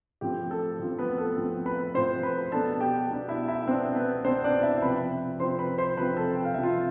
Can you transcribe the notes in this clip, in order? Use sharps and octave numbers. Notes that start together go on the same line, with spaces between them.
A2 F3 C4 G4
A4
A2 F3 C4
B3 B4
A4
A2 F3 C4
B4 B5
A2 F3 C4 C5 C6
B4 B5
B2 B3 D4 A4 A5
G4 G5
B2 B3 D4
E4 E5
E4 E5
B2 B3 C4 D4 C5
B3 B4
B2 B3 C4 D4 C5
D4 D5
E4 E5
C3 F3 C4 B4 B5
C3 F3 C4 C5 C6
B4 B5
C5 C6
C3 F3 C4 B4 B5
A4 A5
G5
F5
C3 F3 C4 E5
F4 F5